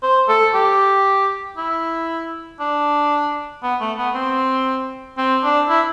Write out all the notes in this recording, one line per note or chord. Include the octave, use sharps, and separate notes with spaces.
C5
A4
G4
E4
D4
B3
A3
B3
C4
C4
D4
E4